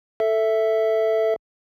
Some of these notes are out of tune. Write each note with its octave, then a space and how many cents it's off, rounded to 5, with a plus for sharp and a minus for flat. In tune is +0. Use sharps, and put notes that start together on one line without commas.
A4 +5 E5 +0